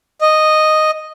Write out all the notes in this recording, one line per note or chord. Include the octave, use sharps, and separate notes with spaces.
D#5